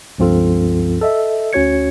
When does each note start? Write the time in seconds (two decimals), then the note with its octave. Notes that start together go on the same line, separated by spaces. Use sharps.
0.18 C#2 G2 F3 C4 F4 A4
1.01 A4 D#5 E5
1.53 D2 C#4 F#4 C#5 G#6 C#7